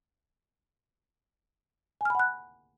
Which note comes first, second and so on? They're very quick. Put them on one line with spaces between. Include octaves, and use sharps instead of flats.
G#5 F6 B5 F#5 F#6